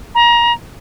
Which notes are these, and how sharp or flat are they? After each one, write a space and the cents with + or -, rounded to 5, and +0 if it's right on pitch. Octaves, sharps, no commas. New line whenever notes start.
A#5 +30